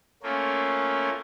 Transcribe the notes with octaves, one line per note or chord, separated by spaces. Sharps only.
A3 A#3 C#4 F4